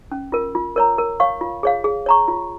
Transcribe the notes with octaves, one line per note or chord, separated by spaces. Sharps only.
C#4
F4 A#4
F4
A#4 C#5 A#5
A#4
C#5 F5 C#6
F4
G#4 C#5 F5
G#4
C#5 A#5 C#6
F4